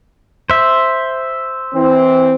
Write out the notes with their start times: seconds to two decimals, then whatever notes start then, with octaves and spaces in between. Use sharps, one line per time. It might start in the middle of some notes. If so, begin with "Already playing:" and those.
0.50 C5 E5
1.74 E3 C4